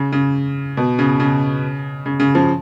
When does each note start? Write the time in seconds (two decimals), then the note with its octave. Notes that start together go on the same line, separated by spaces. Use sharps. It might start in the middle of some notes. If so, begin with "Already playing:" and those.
Already playing: C#3
0.12 C#3
0.77 B2
0.99 C#3
1.20 C#3
2.06 C#3
2.20 C#3
2.35 C#3 F3